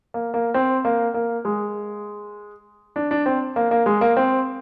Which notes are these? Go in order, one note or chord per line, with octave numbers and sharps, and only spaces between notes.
A#3
A#3
C4
A#3
A#3
G#3
D4
D4
C4
A#3
A#3
G#3
A#3
C4